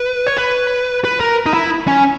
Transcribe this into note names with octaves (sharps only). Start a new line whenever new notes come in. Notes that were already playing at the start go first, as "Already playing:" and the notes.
Already playing: B4
C#5
B4
B4
A#4
D#4
E4
C#4